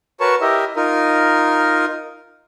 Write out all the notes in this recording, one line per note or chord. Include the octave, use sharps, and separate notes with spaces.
F#4 A#4 B4 C#5 A5 C#6
E4 G4 A#4 D#5 E5
D#4 F4 A#4